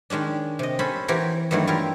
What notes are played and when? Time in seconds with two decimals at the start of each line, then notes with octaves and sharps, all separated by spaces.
0.10 D#3 G#3 C#4 D4
0.59 C3 D#5
0.79 C#4 A4 C5 B5
1.08 E3 C4 F#4 G4 A#4 C#5
1.51 G2 D#3 E3 F#3 A3
1.67 E4 F4 G4 A#4